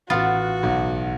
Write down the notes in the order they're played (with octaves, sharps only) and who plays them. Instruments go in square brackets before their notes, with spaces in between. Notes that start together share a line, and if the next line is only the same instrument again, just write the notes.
[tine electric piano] A1 F#5 A6 [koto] B3 F4 [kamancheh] F#4
[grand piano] B1